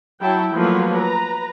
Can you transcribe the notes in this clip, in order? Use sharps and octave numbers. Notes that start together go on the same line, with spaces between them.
F#3 E4 G5 A5
F3 F#3 A3 A#3 F4 B4
B4 A#5